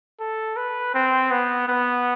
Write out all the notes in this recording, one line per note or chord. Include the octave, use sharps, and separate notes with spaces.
A4
B4
C4
B3
B3